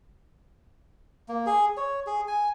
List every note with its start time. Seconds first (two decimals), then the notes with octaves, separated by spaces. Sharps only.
1.28 A#3
1.46 G#4
1.77 C#5
2.07 G#4
2.28 G#5